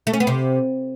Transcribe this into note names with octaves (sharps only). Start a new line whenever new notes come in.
A3
C#4
B3
C3